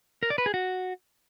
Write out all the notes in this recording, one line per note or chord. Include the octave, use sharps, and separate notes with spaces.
A#4
D5
B4
G#4
F#4